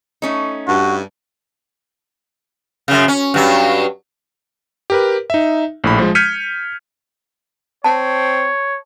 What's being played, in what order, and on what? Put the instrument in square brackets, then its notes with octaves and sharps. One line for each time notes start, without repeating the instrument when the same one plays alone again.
[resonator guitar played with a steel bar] A3 C#4 D#4
[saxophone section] G2 [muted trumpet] F#4
[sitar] F#2 C#3
C#4
G2 F#3
[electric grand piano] G4 A#4 B4
D#4 E5
A#1 A2 B5
F3 G#3
F6 G6 G#6 B6 C#7 D#7
[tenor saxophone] C4 [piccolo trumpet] C#5 [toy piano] A5